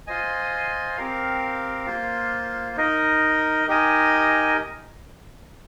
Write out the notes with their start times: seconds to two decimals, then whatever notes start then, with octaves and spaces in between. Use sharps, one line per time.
0.07 F4 C5 D#5 G#5
0.96 C4 G4 A#4 F5
1.86 A#3 F4 C5
2.77 D#4 A#4 D#5
3.67 D#4 G4 A#4 D#5 G#5